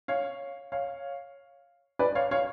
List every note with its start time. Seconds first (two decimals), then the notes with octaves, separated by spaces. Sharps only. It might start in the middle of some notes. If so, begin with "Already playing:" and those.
0.08 C#5 F5
0.72 C#5 F5
1.99 B4 D5
2.15 C#5 F5
2.31 C#5 F5